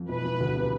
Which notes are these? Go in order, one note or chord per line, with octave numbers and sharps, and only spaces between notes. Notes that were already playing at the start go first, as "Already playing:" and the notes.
Already playing: F2
E1 B4
E1
D2
C3